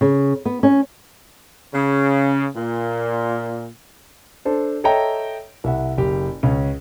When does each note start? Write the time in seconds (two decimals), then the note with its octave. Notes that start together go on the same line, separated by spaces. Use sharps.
0.01 C#3
0.45 B3
0.63 C#4
1.74 C#3
2.55 A#2
4.45 D4 A4 C5
4.84 A4 C#5 D#5 E5 G5 A#5
5.64 C2 E5 F#5
5.98 F#1 G4
6.43 C#2 C#4